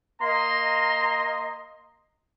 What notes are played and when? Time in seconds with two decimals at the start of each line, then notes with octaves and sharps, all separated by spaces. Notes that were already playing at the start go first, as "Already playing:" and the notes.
0.21 A#3 D#5 A#5 C6